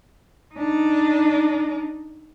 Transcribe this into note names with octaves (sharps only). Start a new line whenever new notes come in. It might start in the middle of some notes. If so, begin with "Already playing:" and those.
D4 D#4